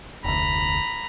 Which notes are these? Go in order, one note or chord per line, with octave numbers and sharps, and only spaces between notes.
F1 D2 A#5 B5